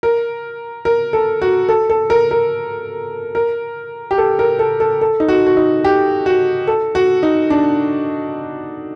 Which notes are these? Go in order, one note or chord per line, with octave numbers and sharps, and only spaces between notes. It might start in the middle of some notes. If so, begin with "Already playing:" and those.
A#4
A#4
A4
F#4
A4
A4
A#4
A#4
A#4
G4
A4
A#4
A4
A4
A4
D#4
F#4
F#4
D#4
G4
F#4
A4
F#4
D#4
D4